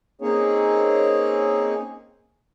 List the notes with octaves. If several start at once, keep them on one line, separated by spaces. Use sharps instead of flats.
A#3 C4 C#4 D#4 G#4 C#5